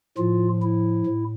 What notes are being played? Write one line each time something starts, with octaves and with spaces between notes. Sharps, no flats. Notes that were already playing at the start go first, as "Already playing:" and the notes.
A2 F3 F4
E4
A2